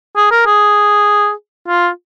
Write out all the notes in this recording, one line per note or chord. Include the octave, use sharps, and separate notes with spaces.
G#4
A#4
G#4
F4